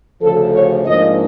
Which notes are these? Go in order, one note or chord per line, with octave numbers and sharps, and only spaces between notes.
D2 C#3 F3 A4
C#5
G#2 F3 A#3 D4 D#5